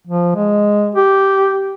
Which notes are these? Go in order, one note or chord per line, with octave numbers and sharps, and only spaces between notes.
F3
G#3
G4